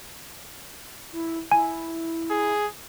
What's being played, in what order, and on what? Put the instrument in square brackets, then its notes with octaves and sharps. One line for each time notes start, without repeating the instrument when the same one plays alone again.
[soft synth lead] E4
[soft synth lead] E4 [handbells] G#5
[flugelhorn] G#4